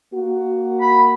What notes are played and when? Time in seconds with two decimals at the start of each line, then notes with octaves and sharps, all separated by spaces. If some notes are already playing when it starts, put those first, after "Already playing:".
0.13 A#3 F#4
0.81 B5